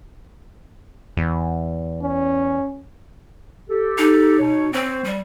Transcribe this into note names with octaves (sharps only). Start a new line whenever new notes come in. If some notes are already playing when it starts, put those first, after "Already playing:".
E2
C#4
G4 A4
D#4
B2 C#5
C4 C5 C#5
G3